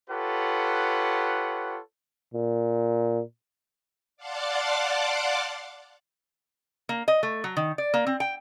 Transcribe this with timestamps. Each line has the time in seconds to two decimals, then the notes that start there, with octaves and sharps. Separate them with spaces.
0.10 F4 G4 A4 B4 C#5 F#5
2.34 A#2
4.17 D5 F5 F#5 A5 C6 D6
6.89 A#3
7.08 D#5
7.23 A3
7.44 F#3
7.57 D#3
7.78 D5
7.94 A#3
8.07 C4
8.20 G5